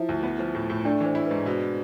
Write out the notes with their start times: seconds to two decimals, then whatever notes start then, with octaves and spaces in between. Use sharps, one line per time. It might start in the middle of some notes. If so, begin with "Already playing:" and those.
Already playing: F3 E4 E5
0.09 D2
0.23 B3
0.39 F3
0.55 A2
0.70 A2
0.85 A3 D4 D5
1.01 E3 C5
1.15 E4
1.26 G#2 B4
1.46 B2